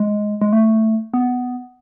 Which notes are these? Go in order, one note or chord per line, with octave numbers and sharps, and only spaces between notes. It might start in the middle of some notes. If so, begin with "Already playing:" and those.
Already playing: G#3
G#3
A3
B3